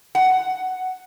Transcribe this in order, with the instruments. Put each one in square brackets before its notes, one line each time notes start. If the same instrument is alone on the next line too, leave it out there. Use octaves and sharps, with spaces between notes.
[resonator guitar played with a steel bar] F#5